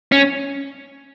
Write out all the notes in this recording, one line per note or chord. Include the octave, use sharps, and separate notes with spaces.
C#4